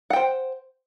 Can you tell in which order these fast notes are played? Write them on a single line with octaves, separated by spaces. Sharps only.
F#5 G5 C5